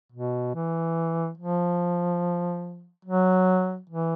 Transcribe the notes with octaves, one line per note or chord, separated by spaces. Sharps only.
B2
E3
F3
F#3
E3